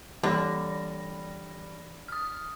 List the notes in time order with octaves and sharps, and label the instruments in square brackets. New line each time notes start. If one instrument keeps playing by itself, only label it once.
[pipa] D3 [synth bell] E3 B5 A#6 [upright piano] G3
[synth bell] D#6 F6